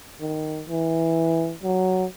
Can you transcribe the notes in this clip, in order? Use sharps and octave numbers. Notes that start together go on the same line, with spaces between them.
D#3
E3
F#3